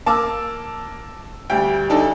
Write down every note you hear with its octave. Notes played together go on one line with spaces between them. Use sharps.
A#3 A5 D6 E6
D2 G3 G5
D4 D#4 A4